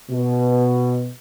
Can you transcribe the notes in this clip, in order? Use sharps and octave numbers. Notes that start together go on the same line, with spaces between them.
B2